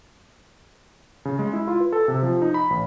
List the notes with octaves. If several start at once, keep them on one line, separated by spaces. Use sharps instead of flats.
C#3
G#3
E4
F4
B4
A4
C3
F3
D#4
B5
A1